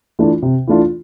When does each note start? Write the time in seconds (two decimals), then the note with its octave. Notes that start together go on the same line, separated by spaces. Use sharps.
0.19 E3 A3 D4 F4
0.42 C3
0.68 E3 A3 D4 F4